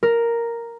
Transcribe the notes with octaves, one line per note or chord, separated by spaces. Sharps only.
A#4